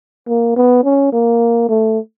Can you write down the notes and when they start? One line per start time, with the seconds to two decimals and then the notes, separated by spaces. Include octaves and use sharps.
0.28 A#3
0.56 B3
0.84 C#4
1.13 A#3
1.69 A3